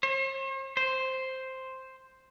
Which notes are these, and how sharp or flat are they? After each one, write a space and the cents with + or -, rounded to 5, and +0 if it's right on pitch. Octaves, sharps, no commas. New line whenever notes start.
C5 +45
C5 +0